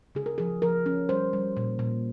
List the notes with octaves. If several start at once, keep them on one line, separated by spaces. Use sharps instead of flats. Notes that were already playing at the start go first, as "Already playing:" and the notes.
C#3 G#4
A#4
F3 G#4
F3 A#4
C#4
G3 C5
G3
A#2
A#2